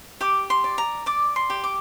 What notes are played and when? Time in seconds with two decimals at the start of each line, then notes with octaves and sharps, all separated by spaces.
0.21 G4 D6
0.50 C6
0.64 D5
0.78 A#5
1.06 D5 D6
1.36 C6
1.50 G4
1.64 D6